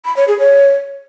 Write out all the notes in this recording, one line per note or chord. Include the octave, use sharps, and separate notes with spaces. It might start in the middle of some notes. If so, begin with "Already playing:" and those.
B5
C#5
G#4
C#5